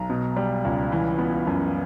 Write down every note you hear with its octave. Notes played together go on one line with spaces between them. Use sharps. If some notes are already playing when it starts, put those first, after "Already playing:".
Already playing: B1 A#5
B2
G3
C#2
E3
B3
F#2